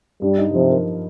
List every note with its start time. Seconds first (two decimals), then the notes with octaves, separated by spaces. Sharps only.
0.22 G2 G3
0.38 D#4
0.53 C3 F3
0.69 A#4